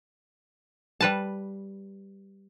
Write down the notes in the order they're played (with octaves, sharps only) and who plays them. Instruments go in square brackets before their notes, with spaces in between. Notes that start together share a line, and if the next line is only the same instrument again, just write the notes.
[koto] G3 B4 A5